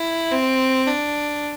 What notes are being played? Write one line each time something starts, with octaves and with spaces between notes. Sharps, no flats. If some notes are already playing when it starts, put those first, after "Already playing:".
Already playing: E4
C4
D4